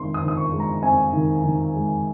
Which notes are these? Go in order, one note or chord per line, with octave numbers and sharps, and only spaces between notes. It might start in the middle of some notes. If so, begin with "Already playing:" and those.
Already playing: D#3 G#3 C4 C6
D#6
D#3
D#6
C#6
G#3
A#5
C4 G#5
D#3
D#3
G#3